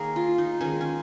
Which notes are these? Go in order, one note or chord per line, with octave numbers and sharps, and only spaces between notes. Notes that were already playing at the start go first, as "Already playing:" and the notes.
Already playing: D#3 A#3 G#4 A#4 C#5
F4
D#4
D#3 G#3 C#4
C#4